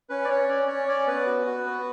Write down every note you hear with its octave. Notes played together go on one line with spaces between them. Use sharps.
C#4 B4
D5
C#4 C#5
C#4 D5
C#4 C#5
C#4 D5
B3 B4
F#4
F#4
B3